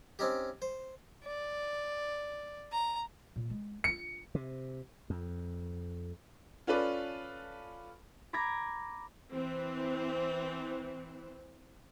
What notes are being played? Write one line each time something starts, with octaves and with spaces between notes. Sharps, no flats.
C4 C#4 D#4 G4
C5
D5
A#5
A#2
G#3
D4 F4 C#7
C3
F2
C#4 F4 A4 B4 D5
A#5 B5 D6 G#6 A#6
E3 C4